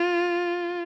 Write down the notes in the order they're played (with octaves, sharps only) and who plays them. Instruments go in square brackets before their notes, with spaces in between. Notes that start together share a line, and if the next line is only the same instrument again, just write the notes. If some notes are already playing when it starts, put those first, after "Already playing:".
Already playing: [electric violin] F4